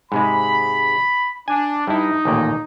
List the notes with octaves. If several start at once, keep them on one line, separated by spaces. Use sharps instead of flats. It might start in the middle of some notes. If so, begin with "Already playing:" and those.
G#2 C3 G#3 B5
D4 G#5
G2 D#4 E4
A1 D#2 A#2